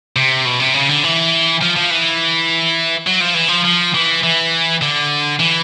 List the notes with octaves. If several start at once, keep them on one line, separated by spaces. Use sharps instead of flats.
C3
B2
C3
C#3
D3
E3
F3
F3
E3
F#3
F3
E3
F3
F3
E3
E3
D3
E3